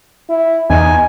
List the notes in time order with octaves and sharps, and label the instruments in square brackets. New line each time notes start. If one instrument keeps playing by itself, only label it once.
[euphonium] E4
[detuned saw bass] E2 [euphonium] D#4 [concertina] G#5